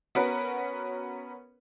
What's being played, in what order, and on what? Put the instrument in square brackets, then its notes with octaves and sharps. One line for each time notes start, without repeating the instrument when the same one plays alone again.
[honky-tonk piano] B3 C#4 F#4 A#4 B4